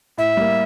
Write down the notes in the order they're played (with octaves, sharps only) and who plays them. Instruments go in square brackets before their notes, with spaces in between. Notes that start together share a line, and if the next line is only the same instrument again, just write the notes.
[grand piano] A2 [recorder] E5
[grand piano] G3 A#3